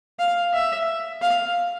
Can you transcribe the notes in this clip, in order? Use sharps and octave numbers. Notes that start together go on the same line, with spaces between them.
F5
E5
F5